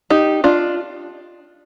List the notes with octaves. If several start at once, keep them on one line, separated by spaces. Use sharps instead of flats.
D#4 G4
D4 F4